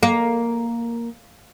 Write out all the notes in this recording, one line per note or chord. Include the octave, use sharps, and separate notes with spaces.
A#3